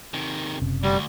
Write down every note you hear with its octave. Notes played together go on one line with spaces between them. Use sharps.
C3 D#3
F#1 C3 C#4
D2 G3